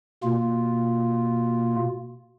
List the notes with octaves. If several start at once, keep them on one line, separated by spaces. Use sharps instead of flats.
B2 A#3 F4